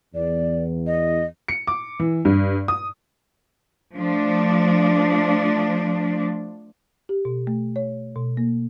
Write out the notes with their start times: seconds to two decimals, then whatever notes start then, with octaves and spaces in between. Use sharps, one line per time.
0.14 E2 D5
0.87 D#5
1.48 C#7
1.67 D6
2.00 E3
2.25 G2
2.68 D#6
3.95 F3 A3 D4
7.09 G4
7.25 B2
7.47 A3
7.76 C#5
8.16 B2
8.37 A#3